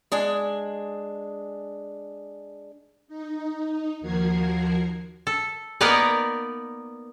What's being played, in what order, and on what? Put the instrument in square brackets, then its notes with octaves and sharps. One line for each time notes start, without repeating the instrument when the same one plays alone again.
[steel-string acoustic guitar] G#3 D4 G#5
[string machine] D#4
D#2 F3 F#4 A#4 G#6 C7
[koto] A4
A#3 B3 D#4 A#4 B4 D5